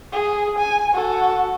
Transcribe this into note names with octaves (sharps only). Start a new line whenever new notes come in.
G#4
G#5
F#4 A4